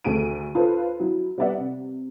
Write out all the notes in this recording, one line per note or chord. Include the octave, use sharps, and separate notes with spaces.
D2 A3 G#4 D7 D#7
F4 A4 B4 C5
F#3 E4
G3 B3 B4 D5 E5 F#5
C3